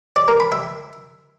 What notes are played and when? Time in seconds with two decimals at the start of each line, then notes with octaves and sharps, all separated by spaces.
0.16 D5
0.28 A#4
0.40 B5
0.52 E5